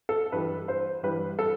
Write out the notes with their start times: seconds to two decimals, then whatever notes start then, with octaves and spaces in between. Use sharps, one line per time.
0.09 A4
0.32 G2 E3 G3 B4
0.68 C5
1.03 G2 E3 G3 B4
1.39 A4